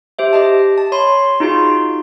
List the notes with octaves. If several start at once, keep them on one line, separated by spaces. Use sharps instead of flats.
G4 C5 E5
G4 D#5 A5
A5
C#5 B5 C6
D#4 F4 F#4 G#4 C6